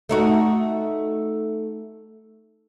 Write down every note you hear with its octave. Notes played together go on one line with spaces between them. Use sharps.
A3 D#4 F#4